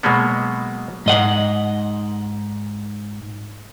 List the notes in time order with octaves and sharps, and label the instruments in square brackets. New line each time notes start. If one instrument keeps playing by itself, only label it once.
[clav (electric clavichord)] B2 F#3 G#3 A#3 B3
[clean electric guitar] G#2 D#5 F#5